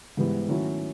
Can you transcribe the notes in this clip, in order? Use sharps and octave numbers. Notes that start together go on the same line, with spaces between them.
G#2 E3 G3 B3 E4
D#3 F#3 A3 C#4 E4